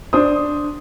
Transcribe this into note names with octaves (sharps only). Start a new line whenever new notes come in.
D4 C5 D#6